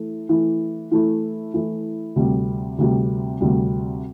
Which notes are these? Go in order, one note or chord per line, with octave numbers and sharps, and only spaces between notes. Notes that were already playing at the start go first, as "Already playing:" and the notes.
Already playing: E3 A3 E4
E3 A3 E4
E3 A3 E4
E3 A3 E4
D2 C3 G3
D2 C3 G3
D2 C3 G3